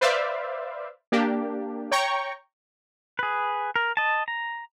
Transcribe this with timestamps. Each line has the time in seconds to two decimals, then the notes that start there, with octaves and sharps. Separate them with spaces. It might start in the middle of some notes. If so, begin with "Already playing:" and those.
0.01 B4 C5 D5 E5 F5
1.12 A#3 D4 G4
1.91 C#5 G5 A#5 C#6
3.19 G#4 B4
3.76 A#4
3.97 D#5 A5
4.28 A#5